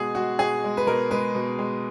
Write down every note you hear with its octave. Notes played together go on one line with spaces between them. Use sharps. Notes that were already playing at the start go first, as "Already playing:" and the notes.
Already playing: B2 G#3 F#4 G#4
G#3 F#4
B2 G#4
G#3
B4
B2 A#4
G#3 B4
B2
G#3